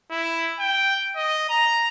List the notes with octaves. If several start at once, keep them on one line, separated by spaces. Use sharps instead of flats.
E4
G5
D#5
A#5